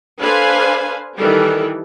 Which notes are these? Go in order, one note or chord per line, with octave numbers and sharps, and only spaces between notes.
D4 A4 B4 C5 F5 G#5
D#3 E3 G3 G4 A4